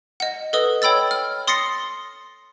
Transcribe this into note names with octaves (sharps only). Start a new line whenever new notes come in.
D#5 F#5
A4 B4 D#5 D#6
C#5 G5 B5 E6 A6
F6
C6 D#6 A6 A#6 C7 C#7